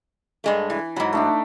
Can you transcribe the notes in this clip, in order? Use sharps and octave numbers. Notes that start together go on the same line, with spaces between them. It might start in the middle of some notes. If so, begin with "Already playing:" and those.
G2 G#3 A3
E3
G#2 F#3 B5
A3 D4 D#4